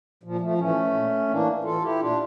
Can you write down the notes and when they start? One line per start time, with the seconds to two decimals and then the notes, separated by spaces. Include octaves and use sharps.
0.23 A#2 F3
0.41 F3 A3
0.58 A2 E3 A3 C#4
0.93 A#2
1.28 A2 E3 A#3 D4
1.64 A2 E3 F4 A4
1.81 E4 G4
1.99 A#2 D4 F4